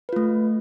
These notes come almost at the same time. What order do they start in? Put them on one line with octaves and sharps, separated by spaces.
B4 F4 A3